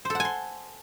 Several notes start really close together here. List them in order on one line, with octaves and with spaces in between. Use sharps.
C5 A4 F#5 G#5 C6